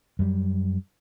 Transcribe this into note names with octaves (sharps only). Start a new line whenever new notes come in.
F#2 G3